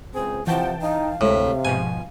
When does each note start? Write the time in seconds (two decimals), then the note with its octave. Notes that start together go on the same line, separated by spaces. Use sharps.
0.14 C#2 C4 G#4 C5
0.47 C3 E3 F3 F#5 G5 A5
0.82 D#4 F5
1.21 D2 A2 C3 G#3 B6
1.65 G#2 B2 F3 G#5